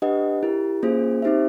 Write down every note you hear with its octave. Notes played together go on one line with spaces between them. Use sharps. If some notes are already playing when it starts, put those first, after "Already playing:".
D4 G4 B4 D#5 F#5
E4 G4 A#4
A#3 C#4 F4 G#4 C5
C4 D#4 G4 C5 E5